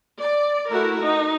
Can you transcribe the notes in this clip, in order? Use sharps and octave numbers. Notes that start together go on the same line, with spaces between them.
D5
A3 E4 F#4 A#4
D#4